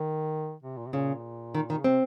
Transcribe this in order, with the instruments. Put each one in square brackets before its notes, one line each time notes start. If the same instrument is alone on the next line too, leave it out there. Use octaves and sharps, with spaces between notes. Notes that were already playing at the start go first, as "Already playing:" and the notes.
Already playing: [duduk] D#3
C3
A#2
C3
[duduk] A#2 [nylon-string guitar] C#3
[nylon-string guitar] D#3
D#3
[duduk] C#3
[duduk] C3 [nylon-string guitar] C4